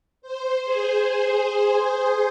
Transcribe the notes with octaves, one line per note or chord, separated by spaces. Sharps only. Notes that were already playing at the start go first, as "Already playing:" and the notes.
C5
G#4